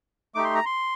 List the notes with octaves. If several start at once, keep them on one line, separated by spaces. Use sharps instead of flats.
A3 D#4 G4 D6
C6
A#5
C6